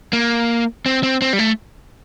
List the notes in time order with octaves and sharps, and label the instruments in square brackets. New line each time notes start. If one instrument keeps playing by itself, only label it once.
[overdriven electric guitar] A#3
C4
C4
C4
G3
A3